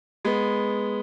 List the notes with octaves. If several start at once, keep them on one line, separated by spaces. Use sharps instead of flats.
G#3 B3